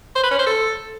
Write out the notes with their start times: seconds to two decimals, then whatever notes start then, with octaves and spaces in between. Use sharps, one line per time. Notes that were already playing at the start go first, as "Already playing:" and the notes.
0.16 C5
0.23 B4
0.31 C#4
0.39 C5
0.46 A4